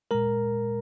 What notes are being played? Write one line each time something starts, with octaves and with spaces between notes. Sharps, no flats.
A#2 G#3 A#4 A#5